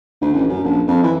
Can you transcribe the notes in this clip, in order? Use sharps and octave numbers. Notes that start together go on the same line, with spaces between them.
D2
A1
F#2
A#1
F2
E3